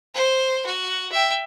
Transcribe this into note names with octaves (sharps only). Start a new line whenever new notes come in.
C5
F#4
E5 G5